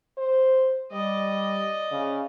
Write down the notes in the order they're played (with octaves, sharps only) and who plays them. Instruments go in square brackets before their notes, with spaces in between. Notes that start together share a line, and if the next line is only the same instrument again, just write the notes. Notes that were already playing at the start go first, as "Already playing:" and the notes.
[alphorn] C5
[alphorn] G3 [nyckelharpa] D5 D#5
[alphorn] C#3